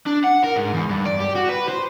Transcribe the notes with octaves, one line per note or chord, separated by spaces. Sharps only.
D4
F#5
A#4
G#2
E2
G2
D5
G4
F#4
B4
C5